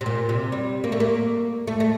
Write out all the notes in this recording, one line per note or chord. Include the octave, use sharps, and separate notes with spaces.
C3
A#2
C3
G3
A#3
A3
A#3
A3
A3